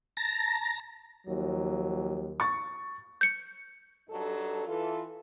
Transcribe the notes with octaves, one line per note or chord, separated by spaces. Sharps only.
A5 A#5 A#6
D#2 F3 F#3
C#6 A6
G6 C#7
G2 F#3 D#4 A4
E3 F4 A4